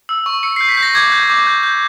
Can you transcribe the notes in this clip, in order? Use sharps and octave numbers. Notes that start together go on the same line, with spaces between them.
E6
C#6
E6 C#7
G6 C7
B6
G6
A#6
D6 G#6
G6
D6
G6
G6